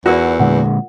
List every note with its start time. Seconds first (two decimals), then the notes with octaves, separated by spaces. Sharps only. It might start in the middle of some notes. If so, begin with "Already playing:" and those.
0.06 E2 F4 F#4 A#4 D5
0.40 A#2 D3 G#3 F#5